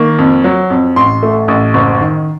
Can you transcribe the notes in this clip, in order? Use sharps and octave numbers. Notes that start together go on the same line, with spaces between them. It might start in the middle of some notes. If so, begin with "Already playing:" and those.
Already playing: D#3 A#3 C#6
F2
F#3
F2
A1 C6
A3
A1
F#1
D#3